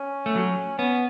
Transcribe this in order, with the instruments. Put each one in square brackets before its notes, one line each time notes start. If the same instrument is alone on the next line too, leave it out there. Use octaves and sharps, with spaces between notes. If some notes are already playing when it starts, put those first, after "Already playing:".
Already playing: [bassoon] C#4
[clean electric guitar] A3
F#3
[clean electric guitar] B3 [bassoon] C#4